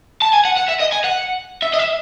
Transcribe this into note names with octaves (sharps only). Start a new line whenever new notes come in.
A5
G#5
F#5
F#5
E5
D#5
G#5
F#5
E5
D#5
E5